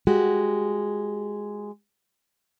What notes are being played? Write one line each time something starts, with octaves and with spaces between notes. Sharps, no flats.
G#3 F#4 G4